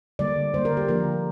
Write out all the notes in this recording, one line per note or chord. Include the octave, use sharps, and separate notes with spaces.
D3 G3 A#3 D5
D3 G3 A#3 C5
A#4
G4
D3 F3 A#3 A#4